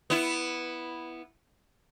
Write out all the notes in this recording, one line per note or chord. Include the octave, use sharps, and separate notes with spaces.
B3 E4